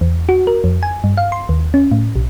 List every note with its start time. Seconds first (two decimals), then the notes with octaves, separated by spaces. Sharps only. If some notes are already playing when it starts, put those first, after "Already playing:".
0.01 E2
0.29 F#4
0.47 A#4
0.64 F2
0.83 G#5
1.04 G2
1.17 F5
1.32 C6
1.49 D#2
1.74 C#4
1.92 A2
2.16 B1